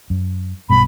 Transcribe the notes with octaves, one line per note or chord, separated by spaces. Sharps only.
F#2
B1 G2 B2 B5